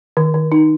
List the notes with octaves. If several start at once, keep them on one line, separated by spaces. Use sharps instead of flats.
D#3
D#3
D#4